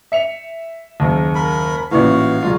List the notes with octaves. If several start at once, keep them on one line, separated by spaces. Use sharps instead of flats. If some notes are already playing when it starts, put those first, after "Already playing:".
E5 C#7 F7
F#1 D#2
A#4 B5
A1 A#2 E3 F#4 F5
E1 F#3 F4